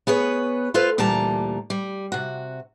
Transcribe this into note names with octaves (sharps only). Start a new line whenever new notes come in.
B3 G#4 B4 C#5
F4 A4 B4 C5 F5
D2 A#2 E3 G3 A5 A#5
G3
C3 F#4